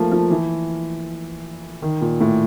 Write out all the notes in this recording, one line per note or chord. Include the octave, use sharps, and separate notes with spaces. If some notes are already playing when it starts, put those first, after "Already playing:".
Already playing: F3 A3 A#3
F3
E3
D#3
A#2
A2